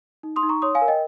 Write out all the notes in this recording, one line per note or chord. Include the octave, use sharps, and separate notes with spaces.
D#4
C6 D#6
D#4
A#5 C#6
C#5 C6 D#6
F5 G#5
A#4
D#5 G5